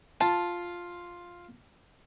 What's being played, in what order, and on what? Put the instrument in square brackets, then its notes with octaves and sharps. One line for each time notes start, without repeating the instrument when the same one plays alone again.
[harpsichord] F4 [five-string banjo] A5